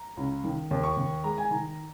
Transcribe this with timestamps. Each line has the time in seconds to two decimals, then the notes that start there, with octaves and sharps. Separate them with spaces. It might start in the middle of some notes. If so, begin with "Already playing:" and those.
Already playing: A#5
0.17 C#2
0.44 D#3
0.71 D#2
0.84 C#6
0.97 D#2
1.24 G#3 A#5
1.38 G#5
1.51 D#3 A#5